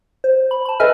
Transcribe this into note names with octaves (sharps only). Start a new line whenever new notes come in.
C5
B5
A5 B5
A4 B4 D#5 E5 G#5 F6